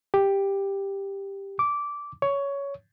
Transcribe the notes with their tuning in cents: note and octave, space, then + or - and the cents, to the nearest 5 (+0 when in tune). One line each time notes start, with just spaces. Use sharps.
G4 +5
D6 -10
C#5 +10